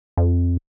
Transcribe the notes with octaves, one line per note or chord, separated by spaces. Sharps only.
F2